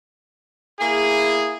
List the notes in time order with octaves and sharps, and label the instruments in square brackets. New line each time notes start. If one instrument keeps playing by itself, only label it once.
[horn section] A#3 E4 G#4